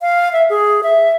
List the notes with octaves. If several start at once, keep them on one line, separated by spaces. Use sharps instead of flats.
F5
E5
G#4
E5